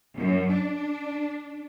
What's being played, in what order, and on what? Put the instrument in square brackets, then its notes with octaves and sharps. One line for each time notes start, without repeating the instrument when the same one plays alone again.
[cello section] F#2
D4